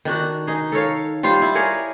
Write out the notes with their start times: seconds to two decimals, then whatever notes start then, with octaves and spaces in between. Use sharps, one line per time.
0.05 D#3 D4 F#4
0.47 D#4 G#4
0.72 A4 A#4 C#5 F5
1.23 G3 F4 C5 F5
1.42 E4
1.55 G#4 A#4 C#5 D5